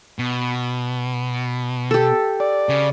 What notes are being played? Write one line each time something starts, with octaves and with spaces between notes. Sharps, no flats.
B2
G4 A4
D5
C#3